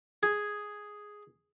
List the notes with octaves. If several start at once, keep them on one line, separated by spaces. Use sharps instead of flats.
G#4